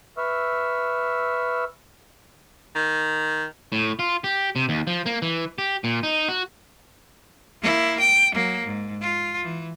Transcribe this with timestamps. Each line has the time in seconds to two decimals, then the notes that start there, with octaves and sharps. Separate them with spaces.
0.18 B4 E5 C#6 E6 F6
2.75 D#3
3.72 A2
3.99 F4
4.24 G4
4.56 C3
4.69 D#2
4.87 F3
5.06 A#3
5.22 E3
5.58 G4
5.84 A#2
6.03 D#4
6.29 F#4
7.62 A#3 E4
8.00 G5
8.34 F#3 A#3
8.65 G#2
9.01 F4
9.43 E3